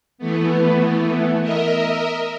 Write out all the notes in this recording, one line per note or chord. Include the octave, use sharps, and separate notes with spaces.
E3 A3 B3
A#4 D#5 E5